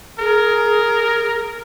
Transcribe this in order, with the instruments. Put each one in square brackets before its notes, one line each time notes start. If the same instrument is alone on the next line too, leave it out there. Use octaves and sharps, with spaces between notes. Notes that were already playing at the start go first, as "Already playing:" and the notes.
[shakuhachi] G#4 [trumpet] A#4